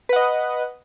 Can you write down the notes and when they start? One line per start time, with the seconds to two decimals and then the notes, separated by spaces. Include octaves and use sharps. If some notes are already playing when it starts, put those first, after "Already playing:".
0.09 B4
0.13 F#5
0.16 D#5